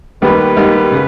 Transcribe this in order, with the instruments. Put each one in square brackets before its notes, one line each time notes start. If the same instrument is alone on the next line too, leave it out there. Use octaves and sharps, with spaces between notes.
[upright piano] D#2 D#3 G3 B3 G4 [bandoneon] B4
[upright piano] D#2 D#3 G3 B3 G4
C#3